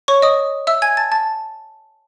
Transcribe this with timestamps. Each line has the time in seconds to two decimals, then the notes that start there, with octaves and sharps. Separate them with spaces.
0.08 C#5 C#6
0.22 D#5 D#6
0.67 E5 E6
0.82 G#5 G#6
0.97 A5 A6
1.12 A5 A6